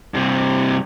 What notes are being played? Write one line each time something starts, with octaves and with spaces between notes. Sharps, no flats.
G2 C3